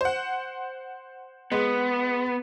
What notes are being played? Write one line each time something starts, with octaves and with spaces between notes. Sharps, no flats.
C5 F#5
G#3 B3